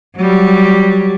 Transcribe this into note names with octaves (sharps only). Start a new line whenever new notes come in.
F#3 G3